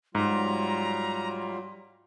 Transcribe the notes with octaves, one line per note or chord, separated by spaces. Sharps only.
G#2 F#3 G3 F4 A#5